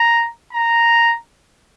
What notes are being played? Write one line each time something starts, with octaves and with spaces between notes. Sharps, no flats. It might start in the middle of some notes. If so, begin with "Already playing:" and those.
Already playing: A#5
A#5